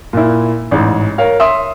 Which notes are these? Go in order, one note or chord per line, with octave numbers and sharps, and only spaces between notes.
A#2 E4
A1 G#2
A#4 C#5 F5
E5 C6 D#6